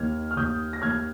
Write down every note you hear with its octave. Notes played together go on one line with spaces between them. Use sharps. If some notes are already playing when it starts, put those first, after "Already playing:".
Already playing: D#2 F6 G#6
F6
D#2 D#6 G6
A#6
D#2 F6 G#6